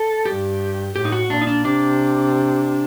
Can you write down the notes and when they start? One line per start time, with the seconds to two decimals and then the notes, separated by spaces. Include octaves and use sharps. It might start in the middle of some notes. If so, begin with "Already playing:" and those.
Already playing: A4
0.26 G2 G4
0.95 A2 G4
1.05 D#4
1.12 F#4
1.30 A#2 D4
1.41 D#4
1.47 D4
1.65 C3 D4